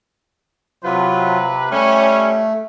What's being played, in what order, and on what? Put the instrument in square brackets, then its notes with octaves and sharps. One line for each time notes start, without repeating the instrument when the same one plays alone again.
[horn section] C3 B4 [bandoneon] F#3 F4
[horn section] G3 C#4 [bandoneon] A3